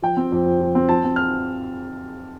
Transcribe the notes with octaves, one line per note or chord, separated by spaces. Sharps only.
F3 G5
C4
F2
F2
F3
C4
F3 A5
C4
F6